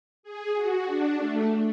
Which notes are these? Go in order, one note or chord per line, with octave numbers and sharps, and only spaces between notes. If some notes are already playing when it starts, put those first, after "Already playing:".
G#4
F#4
D4
A3